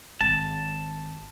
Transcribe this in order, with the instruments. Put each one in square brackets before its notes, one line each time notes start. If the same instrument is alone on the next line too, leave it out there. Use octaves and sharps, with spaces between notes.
[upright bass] G#1 [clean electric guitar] A5